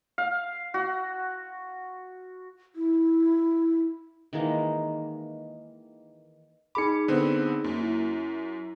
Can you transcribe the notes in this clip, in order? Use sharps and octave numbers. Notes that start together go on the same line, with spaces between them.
F5
F#4
E4
D#3 E3 G#3 A#3
D#4 G#4 B5 D6 C#7
D3 B3 C4
F#2 A#3
E4